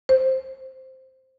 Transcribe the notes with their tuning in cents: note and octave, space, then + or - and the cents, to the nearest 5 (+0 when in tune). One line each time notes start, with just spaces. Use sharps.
C5 +5